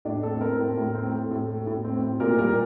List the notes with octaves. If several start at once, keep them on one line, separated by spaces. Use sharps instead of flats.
A2 D4
C4 A4
C4 A#4
A2
A2
C4
A3
A2
A3
A2
C4
A2
A#2 A#4
G3 A#4